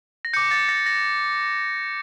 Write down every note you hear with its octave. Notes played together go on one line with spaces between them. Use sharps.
A#6
D6 G6 C#7
A6
A#6
A#6